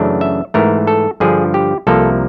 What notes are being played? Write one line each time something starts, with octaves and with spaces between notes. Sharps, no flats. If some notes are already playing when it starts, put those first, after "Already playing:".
Already playing: F#2 C#3 E3 A3 D4
E5
G#2 E3 A3 A#4
A4
G2 D3 F3 G#4
G4
C2 C3 F3 A#3 A4